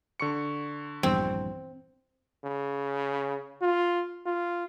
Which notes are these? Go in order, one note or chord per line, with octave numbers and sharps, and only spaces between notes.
D3 C#6 C#7
A#1 E2 G2 C4
C#3
F4
F4